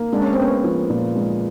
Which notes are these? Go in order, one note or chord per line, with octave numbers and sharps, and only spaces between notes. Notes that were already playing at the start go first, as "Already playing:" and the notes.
Already playing: A#3
G#3 D4
C#4
C4
B3 C#4
F3
A#2
G#3